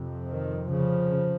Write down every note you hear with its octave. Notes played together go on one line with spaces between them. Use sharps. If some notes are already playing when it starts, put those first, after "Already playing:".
Already playing: F2 C3
D#3
C#3 F3